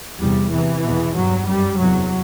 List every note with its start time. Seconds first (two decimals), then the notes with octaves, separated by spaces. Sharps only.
0.20 E2 C3 G3
0.52 E2 C3 E3
0.84 E2 B2
1.16 G2 F#3
1.47 F#2 G3
1.79 E2 C3 F#3